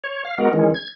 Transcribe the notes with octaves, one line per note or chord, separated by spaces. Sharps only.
C#5
F5
G#3 B3 F#4 A#4
D#3 E3 G#3 C#4
G#6